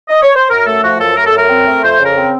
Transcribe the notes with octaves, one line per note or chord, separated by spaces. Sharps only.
D#5
C#5
C5
F#2 A#4
A3 A4
F3 F#4
F#2 A4
A3 A#4
A4
F#2 A#4
C4
A3
F2 C5
C#3
A#4
C4